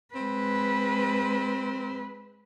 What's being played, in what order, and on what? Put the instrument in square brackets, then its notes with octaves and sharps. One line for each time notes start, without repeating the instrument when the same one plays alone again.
[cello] G#3 B4 [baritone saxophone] C4